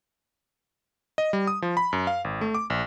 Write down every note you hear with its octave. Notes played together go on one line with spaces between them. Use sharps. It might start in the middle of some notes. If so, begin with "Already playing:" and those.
D#5
G3
D#6
F3
B5
F#2
F5
G#1
A3
D6
A#1